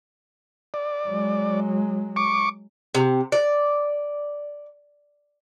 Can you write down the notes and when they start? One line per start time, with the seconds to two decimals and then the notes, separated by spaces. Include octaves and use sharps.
0.74 D5
1.08 F#3 G#3
2.16 C#6 D6
2.95 C3
3.32 D5